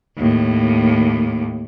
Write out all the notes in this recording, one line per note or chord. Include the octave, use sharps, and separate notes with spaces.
D#2 A2